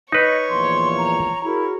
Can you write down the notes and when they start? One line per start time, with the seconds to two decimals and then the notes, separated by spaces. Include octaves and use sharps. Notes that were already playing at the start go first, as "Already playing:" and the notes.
0.12 D#4 B4 C#5 D#5
0.49 E2 A#2 F3 C6
0.98 A#5
1.44 E4 F#4 G#4 A#4